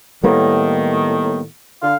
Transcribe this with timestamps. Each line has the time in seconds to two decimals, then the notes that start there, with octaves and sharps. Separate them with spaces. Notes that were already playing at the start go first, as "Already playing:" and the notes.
0.24 A2 D#3 G3 A#3 B3
1.83 D3 F5